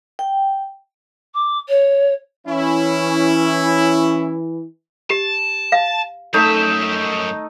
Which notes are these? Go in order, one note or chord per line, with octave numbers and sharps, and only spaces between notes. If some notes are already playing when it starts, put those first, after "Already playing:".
G5
D6
C#5
E3 C#4 E4
G4 A5
F5
F#2 A3 D#4 E5